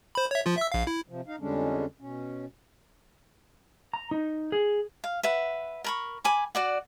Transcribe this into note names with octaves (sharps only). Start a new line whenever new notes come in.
C5 B5
C#5 E5
F3 F4
E5 E6
A#1 F5
E4
C3 F3
D#4 F5
F2 D3 G3 G#3 C#4 D4
B2 C#4
A#5
D#4
G#4
F5
B4 E5 F#5
A#4 B5 C#6
G#5 B5 D6
F#4 D5 F#5